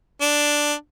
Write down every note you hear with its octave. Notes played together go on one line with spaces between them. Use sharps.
D4